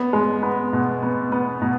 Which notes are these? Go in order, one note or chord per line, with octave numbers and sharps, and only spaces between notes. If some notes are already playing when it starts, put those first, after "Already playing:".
Already playing: B3
G#3
B3
B2
B3
B3
B2